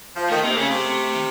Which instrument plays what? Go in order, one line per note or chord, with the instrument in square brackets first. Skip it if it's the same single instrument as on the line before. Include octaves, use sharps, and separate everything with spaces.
[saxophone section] F3
[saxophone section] D#3 [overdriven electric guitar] A3
[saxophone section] C3 [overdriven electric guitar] A#3
[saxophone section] C#3 [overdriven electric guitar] A3
[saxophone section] C3
[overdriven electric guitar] D#3